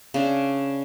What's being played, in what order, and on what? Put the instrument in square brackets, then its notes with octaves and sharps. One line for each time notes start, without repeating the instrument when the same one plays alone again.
[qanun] C#3 D4